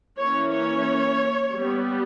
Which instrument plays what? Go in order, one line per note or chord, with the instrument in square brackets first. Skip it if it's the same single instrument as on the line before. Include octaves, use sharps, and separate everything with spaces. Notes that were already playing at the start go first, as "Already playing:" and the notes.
[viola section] E3 A#3 C#4 C#5
C#5
G3 B3